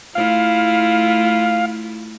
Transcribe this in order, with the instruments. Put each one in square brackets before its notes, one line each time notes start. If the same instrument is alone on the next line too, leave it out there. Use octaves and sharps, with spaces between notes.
[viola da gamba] A3 E4 F4 [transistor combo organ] F5